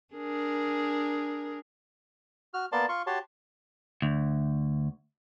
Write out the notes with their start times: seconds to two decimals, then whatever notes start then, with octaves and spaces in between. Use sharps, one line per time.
0.14 D4 G#4 A#4
2.54 F#4 F6
2.72 A#3 B3 D5 A5 C6
2.89 F4 C6 C#6
3.07 F#4 G4 C#5 A5 C6
4.02 D2